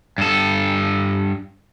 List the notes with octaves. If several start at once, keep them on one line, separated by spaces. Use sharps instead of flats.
G2 A4